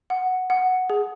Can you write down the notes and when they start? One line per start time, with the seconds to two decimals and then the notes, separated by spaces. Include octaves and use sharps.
0.10 F#5
0.50 F#5
0.90 G#4